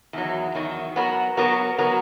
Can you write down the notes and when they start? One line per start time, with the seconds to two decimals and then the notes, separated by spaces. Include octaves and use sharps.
0.13 E2 D#3 F#3
0.55 E2 D#3 F#3
0.96 F#3 B3 F#4 A#4
1.37 F#3 B3 F#4 A#4
1.78 F#3 B3 F#4 A#4